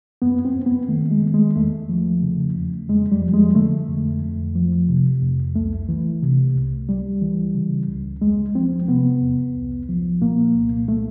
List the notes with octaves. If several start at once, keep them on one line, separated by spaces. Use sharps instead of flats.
F#2 B3
C4
F#2
B3
D#3 A3
G#3
D#3
G#3
E2 A3
F3
C#3
E2
F2 G#3
G3
F3
G#3
D3 A3
F2
F2
F3
C3
F2
C2 A3
E3
C3
C2
C#2 G3
E3
C#3
C#2
E2 G#3
F3 C4
C3 B3
E2
C2
F3
A#2 A#3
C2
A3